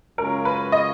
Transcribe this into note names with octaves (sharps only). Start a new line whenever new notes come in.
F#2 C#3 G#3 C#4 F4 A#4
B4
D#5